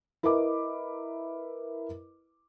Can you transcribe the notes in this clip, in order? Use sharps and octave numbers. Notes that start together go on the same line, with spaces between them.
E4 A#4 B4 D#5 D6